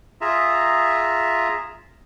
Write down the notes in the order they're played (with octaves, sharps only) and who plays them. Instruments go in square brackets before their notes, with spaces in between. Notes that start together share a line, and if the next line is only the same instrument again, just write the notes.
[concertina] F4 G#4 E5 A#5